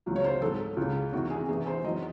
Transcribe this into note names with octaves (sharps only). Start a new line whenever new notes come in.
C#2 C#3 F#3
C#5
C5
G#2 F#3 A4
C#2 C#3 G#3
E2 C3 D#3 F#4
G#4
E2 C3 E3 G#4
C5
E2 D#3 F#3 D#5